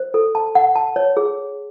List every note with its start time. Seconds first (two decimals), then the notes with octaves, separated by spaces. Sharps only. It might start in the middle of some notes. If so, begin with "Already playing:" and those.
Already playing: C5
0.14 A4
0.35 A5
0.55 F#5
0.76 A5
0.96 C#5
1.17 G#4